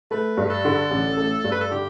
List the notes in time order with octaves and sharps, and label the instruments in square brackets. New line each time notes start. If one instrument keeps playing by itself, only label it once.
[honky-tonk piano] A3 [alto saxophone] B4
[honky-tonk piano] G2
[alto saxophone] A4
[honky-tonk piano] D3
A1
A3
G2
[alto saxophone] B4
A4
[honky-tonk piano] D3 [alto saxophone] G4